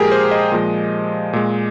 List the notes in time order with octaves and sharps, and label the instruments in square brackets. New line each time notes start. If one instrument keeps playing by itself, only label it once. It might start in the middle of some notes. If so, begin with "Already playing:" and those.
Already playing: [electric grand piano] A#2 F3 G#3 G4 G#4 A#4
C5
D#5
A#2 F3 G#3
A#2 G#3